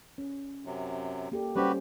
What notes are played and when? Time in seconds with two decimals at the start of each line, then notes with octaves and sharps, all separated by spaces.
0.18 C#4
0.65 F#2 C3 F#3
1.32 A#3 G4 A4
1.56 G3 C#4 F#4 G4 B4 C5